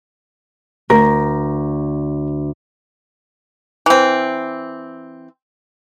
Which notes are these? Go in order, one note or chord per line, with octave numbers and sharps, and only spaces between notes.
D2 A#4
E3 C4